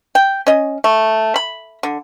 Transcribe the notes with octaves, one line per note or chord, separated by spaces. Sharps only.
G5
C#4 D#5
A3
B5
D3